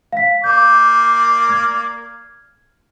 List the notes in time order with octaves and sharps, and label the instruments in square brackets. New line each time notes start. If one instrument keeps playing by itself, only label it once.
[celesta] F5 B6
[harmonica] A#3 D5 [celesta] G6
[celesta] F6 G#6